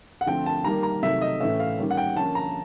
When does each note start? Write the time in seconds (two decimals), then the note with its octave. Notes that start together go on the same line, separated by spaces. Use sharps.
0.21 F#5
0.26 D3 F3 A3 C4 G5
0.46 A5
0.64 D#3 G3 A#3 A#5
0.83 A#5
1.02 C3 D#3 F#3 A3 E5
1.21 D#5
1.40 A2 E3 A3 C#4 E5
1.60 F5
1.79 D#3 G3 A#3 C#4
1.91 F#5
1.97 G5
2.16 D3 F3 A#3 C#4 A5
2.35 A#5